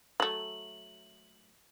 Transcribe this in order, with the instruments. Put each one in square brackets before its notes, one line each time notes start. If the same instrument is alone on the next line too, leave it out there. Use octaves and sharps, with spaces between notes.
[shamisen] F#3 A3 [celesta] F#7